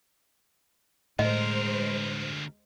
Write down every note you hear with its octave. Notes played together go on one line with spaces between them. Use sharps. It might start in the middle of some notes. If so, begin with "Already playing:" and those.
D2 A2 G#3 A#4 C5 D#5